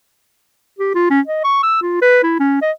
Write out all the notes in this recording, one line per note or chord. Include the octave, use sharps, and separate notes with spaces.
G4
F4
C#4
D#5
C#6
E6
F4
B4
E4
C#4
D#5